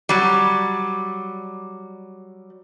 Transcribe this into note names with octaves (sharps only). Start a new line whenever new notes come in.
F#3 G3